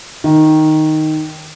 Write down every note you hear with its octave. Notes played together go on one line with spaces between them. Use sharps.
D#3